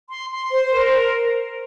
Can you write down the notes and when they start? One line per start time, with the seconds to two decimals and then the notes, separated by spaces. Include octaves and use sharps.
0.08 C6
0.30 C6
0.50 C5
0.72 A#4